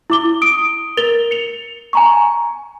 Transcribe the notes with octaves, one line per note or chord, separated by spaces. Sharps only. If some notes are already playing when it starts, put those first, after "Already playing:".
E4 D6 G7
D#6 D7
A#4 A6 F7 G7
C#7 F7
G#5 A#5 C#6